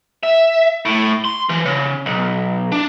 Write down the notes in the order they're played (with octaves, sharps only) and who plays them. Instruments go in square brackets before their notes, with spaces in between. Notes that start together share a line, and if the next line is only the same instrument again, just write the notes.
[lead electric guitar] E5
A2
C6
E3
C#3
B1
D4